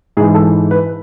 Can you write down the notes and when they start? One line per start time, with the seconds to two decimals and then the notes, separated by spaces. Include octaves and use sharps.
0.17 G#2 G#4
0.20 E3
0.35 A4
0.71 B4